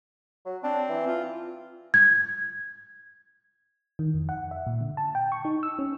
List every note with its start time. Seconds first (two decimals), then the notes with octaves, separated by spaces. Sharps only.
0.46 F#3
0.64 C4 D4
0.89 E3
1.07 F4
1.94 G#6
3.99 D#3
4.14 F2
4.29 F#5
4.51 E5
4.66 A#2
4.81 D3
4.97 A5
5.15 G5
5.32 C#6
5.45 D#4
5.63 E6
5.79 C#4